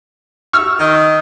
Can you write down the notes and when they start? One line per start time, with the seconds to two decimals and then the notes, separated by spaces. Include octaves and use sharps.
0.53 C#6 E6 F6
0.79 D#3